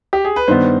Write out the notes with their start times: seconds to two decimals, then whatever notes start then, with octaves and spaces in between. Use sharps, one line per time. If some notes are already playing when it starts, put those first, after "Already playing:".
0.13 G4
0.25 G#4
0.36 B4
0.48 G2 D#3 B3 C5